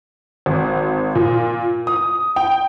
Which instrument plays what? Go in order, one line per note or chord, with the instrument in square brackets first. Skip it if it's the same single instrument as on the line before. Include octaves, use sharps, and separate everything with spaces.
[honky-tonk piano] G#1
A#2
D#6
G5